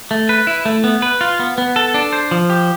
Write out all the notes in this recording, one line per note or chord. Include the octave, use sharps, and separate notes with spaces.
A3
B4
E4
A3
B3
B4
F4
B3
B3
A4
D4
C5
F3
G4